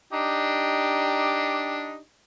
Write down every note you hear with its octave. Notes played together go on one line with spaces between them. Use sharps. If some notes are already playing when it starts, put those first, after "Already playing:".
D4 D#4 G4